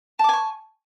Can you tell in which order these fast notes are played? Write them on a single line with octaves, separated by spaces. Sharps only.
A5 D6 G#5 C#6